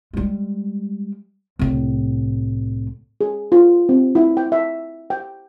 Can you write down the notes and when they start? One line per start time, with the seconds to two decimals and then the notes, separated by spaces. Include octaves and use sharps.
0.13 G3 G#3
1.59 C2 A2
3.21 G#4
3.52 F4
3.89 C4
4.15 E4
4.37 G5
4.52 E5
5.10 G5